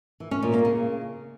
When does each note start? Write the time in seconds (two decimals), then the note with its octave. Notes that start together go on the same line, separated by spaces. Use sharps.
0.20 E3
0.31 C#4
0.43 A#2
0.54 A#3
0.65 C#3